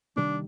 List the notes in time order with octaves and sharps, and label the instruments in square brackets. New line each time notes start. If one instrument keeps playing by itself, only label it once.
[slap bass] C3 D#3 G3 A#3 [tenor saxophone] D4